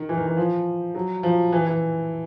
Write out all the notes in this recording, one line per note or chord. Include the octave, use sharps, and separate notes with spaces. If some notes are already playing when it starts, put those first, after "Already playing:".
Already playing: D#3
E3
D#3
E3
F3
F#3
F3
E3
E3